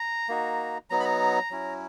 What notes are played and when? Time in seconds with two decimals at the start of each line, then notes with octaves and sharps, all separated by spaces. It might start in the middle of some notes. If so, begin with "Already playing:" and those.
Already playing: A#5
0.29 A#3 D#4 F#4
0.90 F#3 B3 D#4 A#5
1.00 B5
1.05 A#5
1.51 F#3 C#4 E4